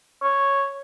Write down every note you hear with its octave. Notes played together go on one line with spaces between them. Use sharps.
C#5